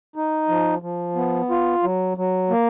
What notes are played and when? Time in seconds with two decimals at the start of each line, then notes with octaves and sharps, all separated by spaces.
0.16 D#4
0.48 F3
0.82 F3
1.16 B3
1.50 F4
1.83 F#3
2.17 F#3
2.50 A#3